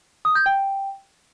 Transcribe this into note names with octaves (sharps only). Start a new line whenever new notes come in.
D#6
G6
G5